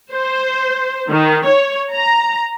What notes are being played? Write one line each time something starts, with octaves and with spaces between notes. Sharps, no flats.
C5
D#3
C#5
A#5